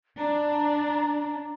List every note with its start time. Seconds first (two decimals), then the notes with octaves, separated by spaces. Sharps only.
0.18 D4 A#5